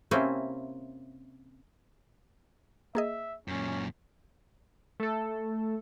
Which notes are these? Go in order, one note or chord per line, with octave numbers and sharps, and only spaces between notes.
C3 A#3 C4 C#4 E4
A#3 G#4 D#5 E5
F#2 A#2 C#4
A3 A4